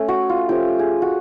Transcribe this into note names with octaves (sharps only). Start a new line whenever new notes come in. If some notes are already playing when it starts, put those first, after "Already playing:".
Already playing: A3 C#4
F#4
F4
F3 A3 C#4 F4 G4
G#4
F#4